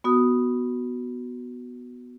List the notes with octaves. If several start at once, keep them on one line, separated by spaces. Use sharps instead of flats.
B3 F#4 D#6